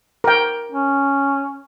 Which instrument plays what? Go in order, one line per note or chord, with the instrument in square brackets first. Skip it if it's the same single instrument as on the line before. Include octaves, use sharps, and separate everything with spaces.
[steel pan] A#4 G5
[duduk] C#4